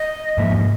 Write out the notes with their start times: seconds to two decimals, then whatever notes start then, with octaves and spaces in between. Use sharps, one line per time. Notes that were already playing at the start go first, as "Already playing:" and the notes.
Already playing: D#5
0.37 G#2 F3 A#3 E5
0.54 D#5